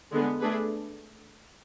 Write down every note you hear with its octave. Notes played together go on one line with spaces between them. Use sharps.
D3 G#3 B3
A3 D4 G#4 B4